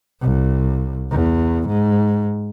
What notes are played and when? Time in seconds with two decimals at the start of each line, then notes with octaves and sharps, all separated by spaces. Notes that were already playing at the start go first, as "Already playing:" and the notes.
0.21 C2
1.11 E2
1.68 G#2